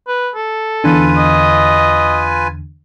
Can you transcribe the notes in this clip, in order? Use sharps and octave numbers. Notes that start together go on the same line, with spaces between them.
B4
A4
E2 D3 F4 B4 G#5
D#5